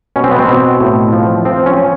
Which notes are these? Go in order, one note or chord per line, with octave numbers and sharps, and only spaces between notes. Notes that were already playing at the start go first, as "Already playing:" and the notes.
B2 C#4
C4
B3
C4
B2
A2
F3
F3 C4
C#4
F3